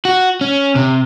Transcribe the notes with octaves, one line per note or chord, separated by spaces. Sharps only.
F#4
C#4
C3